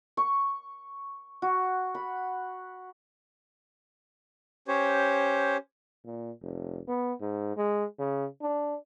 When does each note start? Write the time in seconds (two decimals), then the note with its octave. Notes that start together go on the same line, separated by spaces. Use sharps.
0.17 C#6
1.42 F#4
1.95 B5
4.68 C#4 G4 C5 C#5
6.06 A#2
6.41 F1
6.88 B3
7.21 G#2
7.56 G#3
7.98 C#3
8.42 D4